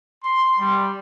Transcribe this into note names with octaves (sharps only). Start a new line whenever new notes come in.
C6
G3